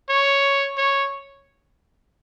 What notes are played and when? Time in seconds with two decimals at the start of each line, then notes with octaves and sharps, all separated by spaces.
0.10 C#5
0.78 C#5